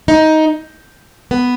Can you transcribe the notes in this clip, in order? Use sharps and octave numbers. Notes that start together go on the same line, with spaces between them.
D#4
B3